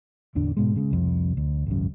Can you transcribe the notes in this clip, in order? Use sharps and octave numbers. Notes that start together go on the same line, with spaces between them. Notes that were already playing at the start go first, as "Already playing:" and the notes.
A1 E2 D3 D4
G#2 B2 G#3
C#3 G#3
C2 F2
D2
G#1 C#2 F#2